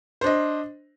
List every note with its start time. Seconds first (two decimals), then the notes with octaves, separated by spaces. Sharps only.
0.21 C5
0.24 D4
0.26 D#5